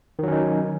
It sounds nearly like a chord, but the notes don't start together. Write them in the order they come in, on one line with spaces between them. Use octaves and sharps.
D#3 F#3 C#4 D#4